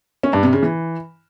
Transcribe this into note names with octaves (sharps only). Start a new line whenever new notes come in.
C#4
G2
C3
C#3
E3